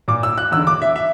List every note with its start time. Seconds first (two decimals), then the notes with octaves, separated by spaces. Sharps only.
0.08 A#2 D6
0.23 E6
0.38 F#6
0.52 E2 E6
0.56 D3
0.67 D6
0.82 E5
0.96 E5